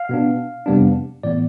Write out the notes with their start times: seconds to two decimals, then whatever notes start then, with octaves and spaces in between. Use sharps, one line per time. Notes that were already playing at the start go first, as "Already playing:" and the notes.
Already playing: F5
0.09 B2 B3 D4
0.66 F2 C3 G3 B3 D4
1.23 A2 E3 B3 D5